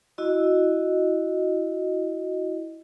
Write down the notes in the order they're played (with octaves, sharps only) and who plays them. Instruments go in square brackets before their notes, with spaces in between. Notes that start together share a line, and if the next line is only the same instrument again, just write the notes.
[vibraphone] E4 F#4 D#5